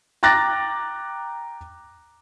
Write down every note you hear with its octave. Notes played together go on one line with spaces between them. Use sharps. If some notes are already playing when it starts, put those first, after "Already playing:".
G5 A#5 D6 F#6 A6 A#6